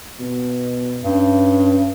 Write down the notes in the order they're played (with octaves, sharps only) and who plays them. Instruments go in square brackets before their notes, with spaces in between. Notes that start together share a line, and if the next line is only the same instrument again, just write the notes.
[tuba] B2
[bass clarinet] G2 [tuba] C#4